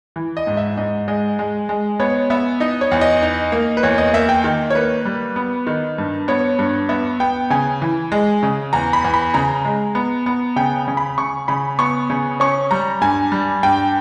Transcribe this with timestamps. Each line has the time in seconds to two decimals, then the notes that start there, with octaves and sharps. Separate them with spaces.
0.16 E3
0.37 D#5
0.47 G#2
0.57 E5
0.77 G#2 D#5
1.08 G#3 D#5
1.39 G#3
1.69 G#3
2.00 B3 C#5
2.30 B3 E5
2.60 D#4 D#5
2.81 C#5
2.91 E2
3.01 D#5
3.23 D#4
3.52 A#3
3.77 B4
3.83 E2 C#5
3.98 D#5
4.13 A#3 E5
4.29 G5
4.44 D#3
4.70 C#5
4.75 A#3 B4
5.05 G3
5.36 B3
5.67 D#3
5.98 G2
6.28 B3 C#5
6.59 G2
6.89 B3 E5
7.20 B3 G5
7.50 C#3 G#5
7.82 E3
8.12 G#3
8.43 C#3
8.73 E2 A#5
8.93 B5
9.04 E2
9.14 B5
9.34 C#3 A#5
9.65 G#3
9.95 B3
10.26 B3
10.56 C#3 G5
10.88 C#3
10.97 B5
11.18 C#3 C#6
11.48 C#3 B5
11.79 B3 C#6
12.10 C#3
12.40 C#4 C#6
12.71 G3 A#5
13.01 G2 G#5
13.32 G3
13.63 G2 G5